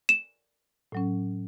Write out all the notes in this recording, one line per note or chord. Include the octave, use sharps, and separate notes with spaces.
E7
A2 F#3 C#4